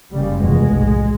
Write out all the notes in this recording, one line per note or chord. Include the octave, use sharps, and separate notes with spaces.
F#1 F#2 C#3 G3
F1 E2 B2 G#3
B1 A2